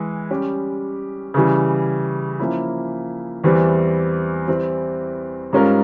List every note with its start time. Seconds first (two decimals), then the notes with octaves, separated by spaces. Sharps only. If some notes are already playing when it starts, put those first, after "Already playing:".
Already playing: E3 G#3
0.31 G3 C#4 G4
1.34 C#3 E3 G3
2.39 F3 A#3 C#4 E4
3.44 E2 E3 G3 C4
4.48 E3 G3 C4 E4
5.53 G#2 G3 C#4 F4 A#4